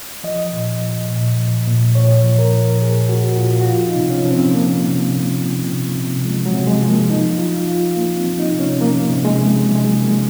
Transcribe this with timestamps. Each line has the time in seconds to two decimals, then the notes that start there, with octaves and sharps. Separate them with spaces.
0.24 F3 D#5
0.52 A#2
0.81 F3
1.09 A#2
1.39 F3
1.67 A#2
1.95 A#2 C#5
2.24 F3
2.39 A#4
2.52 F3
2.81 A#2 G#4
3.09 A#2 F#4
3.28 F#4
3.38 A#2 F4
3.61 F#4
3.67 F3 F4
3.88 D#4
3.95 C3
4.10 C#4
4.25 F3
4.31 C4
4.53 F3 A#3
4.82 C3
5.10 C3
5.39 F3
5.67 C3
5.95 C3
6.24 F3 G#3
6.46 F#3
6.53 C3
6.67 G#3
6.81 F3
6.89 A#3
7.10 F3 D#4
7.38 F3 F4
7.68 F3 F4
7.95 F3 A#3
8.17 C4
8.25 F3
8.39 D#4
8.53 C3
8.60 C#4
8.81 F3 A#3
9.09 C3
9.25 G#3
9.39 C3
9.67 C3 F#3
9.75 G#3
9.84 F#3
9.96 F3
10.02 A#3
10.10 G#3